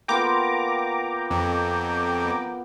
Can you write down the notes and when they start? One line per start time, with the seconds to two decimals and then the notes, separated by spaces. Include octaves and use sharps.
0.08 A#3 B3 F4 G5 A#5 D6
1.31 F2
2.24 B3